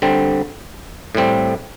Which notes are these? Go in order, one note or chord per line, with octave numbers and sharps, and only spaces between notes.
D3 G3 C4
A2 G3 C4